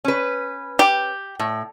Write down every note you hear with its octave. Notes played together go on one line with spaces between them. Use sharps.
C#4 B4
G4
A2